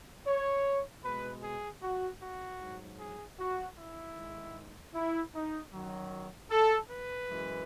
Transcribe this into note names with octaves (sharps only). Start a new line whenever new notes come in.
C#5
B2 G#3 B4
G#4
F#4
F#4
G#2 F#3
G#4
F#4
E4
G#2 D#3 G#3
E4
D#4
F#2 D#3 F#3
A4
B4
F#2 E3 G#3